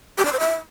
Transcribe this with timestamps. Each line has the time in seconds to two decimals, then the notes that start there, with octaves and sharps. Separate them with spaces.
0.18 G4
0.25 D5
0.32 C5
0.40 E5